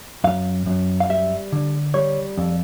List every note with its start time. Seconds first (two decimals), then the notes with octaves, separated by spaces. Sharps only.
0.24 F#2 F5
0.66 F#2
1.00 F5
1.09 G3 E5
1.52 D3
1.94 G3 C#5
2.38 F2